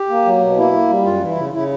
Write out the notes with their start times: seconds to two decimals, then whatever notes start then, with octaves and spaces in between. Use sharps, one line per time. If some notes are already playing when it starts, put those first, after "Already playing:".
Already playing: G4
0.09 A#3
0.26 F#3
0.42 B2
0.57 A#3 E4
0.73 A#3
0.90 G3
1.05 F#2 F4
1.21 E3
1.29 E4
1.36 C#3
1.53 C#3 E4